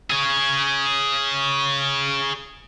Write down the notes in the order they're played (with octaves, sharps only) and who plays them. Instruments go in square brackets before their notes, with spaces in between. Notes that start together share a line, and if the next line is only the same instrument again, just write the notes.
[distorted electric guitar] G#4 C#5